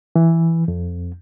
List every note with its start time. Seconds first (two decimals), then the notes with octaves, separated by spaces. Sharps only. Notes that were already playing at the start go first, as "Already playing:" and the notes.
0.16 E3
0.68 F2